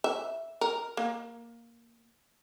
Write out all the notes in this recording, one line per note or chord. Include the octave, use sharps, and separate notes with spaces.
E5
A#4
A#3